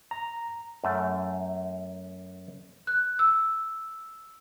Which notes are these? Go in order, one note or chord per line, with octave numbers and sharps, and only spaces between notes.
A#5
F#2 A3
F#6
E6